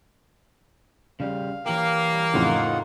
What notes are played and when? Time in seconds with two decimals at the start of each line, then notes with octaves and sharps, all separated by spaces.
1.20 C#3 G3 F5
1.66 E3 A#3 G4
2.12 G3
2.34 F2 A2 C#3 D#4 F4 F#5